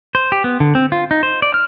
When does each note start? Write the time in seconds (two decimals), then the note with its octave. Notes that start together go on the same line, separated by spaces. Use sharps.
0.15 C5
0.32 G4
0.44 B3
0.60 D3
0.75 C4
0.92 F4
1.11 D#4
1.23 C5
1.42 D5
1.54 F6